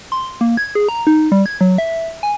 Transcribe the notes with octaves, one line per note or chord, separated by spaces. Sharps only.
C6
A#3
G#6
G#4
A#5
D#4
G3
G#6
F#3
E5
G#5